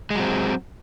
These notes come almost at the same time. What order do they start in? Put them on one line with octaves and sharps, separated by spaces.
G#3 F#3 C4